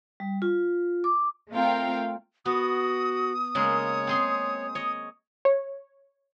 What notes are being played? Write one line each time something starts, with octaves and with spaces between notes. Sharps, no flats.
G3
F4
D6
A3 C4 F4 A#4 F5 G5
B3 F#4 D#6
C#3 G#3 A#3 C#5
C4 G#4 C6
C#5 D#5
C#5